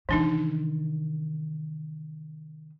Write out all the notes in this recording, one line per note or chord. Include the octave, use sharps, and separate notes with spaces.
C3 D#3 E3 D4 D#4